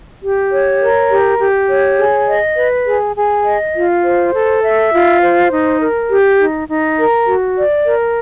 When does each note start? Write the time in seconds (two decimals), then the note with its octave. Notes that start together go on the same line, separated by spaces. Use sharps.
0.22 G4
0.51 C#5
0.81 A#4
1.09 G4
1.39 G4
1.68 C#5
1.98 G#4
2.27 D#5
2.56 B4
2.86 G#4
3.15 G#4
3.45 D#5
3.74 F4
4.04 C5
4.33 A4
4.62 E5
4.92 F4
5.21 C5
5.51 D#4
5.80 A#4
6.09 G4
6.39 D#4
6.68 D#4
6.97 A#4
7.27 F#4
7.56 D5
7.85 A#4